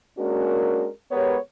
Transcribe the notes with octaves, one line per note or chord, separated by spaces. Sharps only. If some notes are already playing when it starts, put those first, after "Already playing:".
G#3 A#3 C#4 D4 F#4 A#4
G#3 B3 G4 A#4 B4 C#5